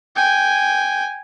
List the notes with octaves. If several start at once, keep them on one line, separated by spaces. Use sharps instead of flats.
G5 G#5